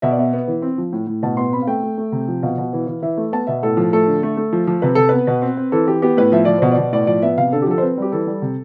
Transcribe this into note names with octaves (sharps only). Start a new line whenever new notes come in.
B2 E5
D5
B3 E5
B3
E3
C4
F3
A2
A2
B2 A5
B3 C6
C4 B5
F5
A3 G5
A3
A3
C3
F3
B2 F5
B2
E3
E3
E3 E5
A3
B3 A5
B2 E5
A2 A4
F3
A3 A4
D3
A3 A4
A3
F3
F3
C3 B4
C3 A4
B3 B4
B2
C4
C4
E3 A4
E3 G4
B3 G4
A2 B4
F3 E5
F3 D5
B2 C5
D5
B2
A2 D5
F3 D5
B3 E5
C3 F5
D3 A4
G4
F3 A4
C5
C4 B4
G3 G4
E3 A4
G3
C3